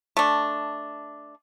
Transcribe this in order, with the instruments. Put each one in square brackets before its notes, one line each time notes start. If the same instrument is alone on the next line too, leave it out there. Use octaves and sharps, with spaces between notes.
[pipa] A3 D4